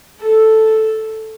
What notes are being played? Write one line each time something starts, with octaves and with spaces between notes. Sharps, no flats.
A4